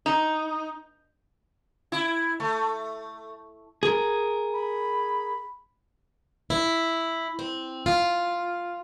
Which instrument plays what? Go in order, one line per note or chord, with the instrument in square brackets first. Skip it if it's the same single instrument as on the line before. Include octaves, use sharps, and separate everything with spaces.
[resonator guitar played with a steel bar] D#4
[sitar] E4
A3
[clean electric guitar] G#4 A#4
[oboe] B5
[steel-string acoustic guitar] E4
C4
F4